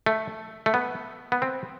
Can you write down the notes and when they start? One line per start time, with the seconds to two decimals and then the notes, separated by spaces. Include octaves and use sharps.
0.06 A3
0.66 A3
0.74 B3
1.32 B3
1.42 C4